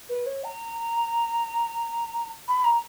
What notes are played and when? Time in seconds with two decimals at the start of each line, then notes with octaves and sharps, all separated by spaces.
0.09 B4
0.26 C#5
0.44 A#5
2.48 B5
2.64 A#5